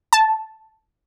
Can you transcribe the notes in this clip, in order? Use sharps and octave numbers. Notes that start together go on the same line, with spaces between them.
A5